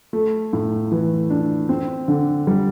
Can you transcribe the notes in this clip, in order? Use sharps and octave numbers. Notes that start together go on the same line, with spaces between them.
A3
A2
E3
D4
C4
D3
G3